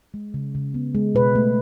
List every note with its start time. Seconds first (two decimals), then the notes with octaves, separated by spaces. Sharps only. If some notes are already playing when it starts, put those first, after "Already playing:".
0.14 G#3
0.34 C#3
0.55 C#3
0.74 B3
0.95 G#3
1.15 B2 B4
1.35 A3